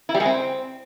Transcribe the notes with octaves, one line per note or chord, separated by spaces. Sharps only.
E4
G3
G#3
C4